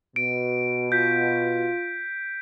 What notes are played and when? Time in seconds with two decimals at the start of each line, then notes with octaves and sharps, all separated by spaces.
0.16 B2 D7
0.92 F4 G6 B6